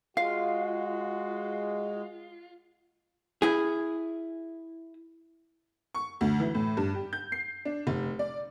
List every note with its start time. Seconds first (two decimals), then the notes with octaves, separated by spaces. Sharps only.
0.17 G#3 F4 F#4 F5
3.42 E4 G#4
5.95 C#6
6.21 D2
6.40 E3
6.54 A2
6.77 G2
6.94 G4
7.13 G6
7.32 C7
7.65 D4
7.87 F1
8.19 D5